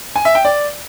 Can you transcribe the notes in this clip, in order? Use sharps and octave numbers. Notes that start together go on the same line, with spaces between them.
G#5
E5
G5
D5